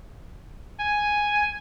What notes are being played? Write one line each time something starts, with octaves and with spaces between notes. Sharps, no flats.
G#5